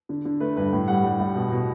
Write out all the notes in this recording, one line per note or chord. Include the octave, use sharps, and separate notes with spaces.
D3
D3
A3 B4
G2 B4
A2
G3 F#5
G3
A2
B2
B2